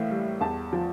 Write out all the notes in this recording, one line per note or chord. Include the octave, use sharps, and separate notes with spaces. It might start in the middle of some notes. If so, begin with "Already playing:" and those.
Already playing: A2 E3 A#3 E5 F5
G3
E2 A5
F3